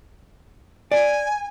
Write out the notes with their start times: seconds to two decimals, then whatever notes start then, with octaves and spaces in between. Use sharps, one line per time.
0.92 D5 G#5